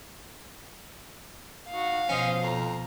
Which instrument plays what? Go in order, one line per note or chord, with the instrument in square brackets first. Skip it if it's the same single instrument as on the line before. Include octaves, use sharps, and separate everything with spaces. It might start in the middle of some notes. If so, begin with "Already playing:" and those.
[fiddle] D#4 F#4 [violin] F5
[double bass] B2 F3 [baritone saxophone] C#4 [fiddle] C5 D#5
[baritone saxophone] F2 [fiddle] A#5